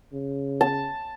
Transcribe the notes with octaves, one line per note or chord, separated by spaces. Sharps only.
C#3
A5